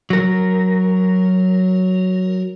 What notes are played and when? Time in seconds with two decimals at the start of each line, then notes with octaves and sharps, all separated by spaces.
0.10 F#3 A#4